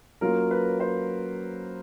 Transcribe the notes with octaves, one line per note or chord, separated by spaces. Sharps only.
F#3 A#3 C#4 F4 A#4
B4
C5